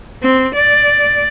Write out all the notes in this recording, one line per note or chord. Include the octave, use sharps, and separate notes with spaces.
C4
D5